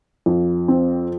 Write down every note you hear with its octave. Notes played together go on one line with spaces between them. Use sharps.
F2
C4